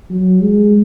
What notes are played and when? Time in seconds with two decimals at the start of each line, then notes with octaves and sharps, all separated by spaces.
0.10 F#3
0.41 G#3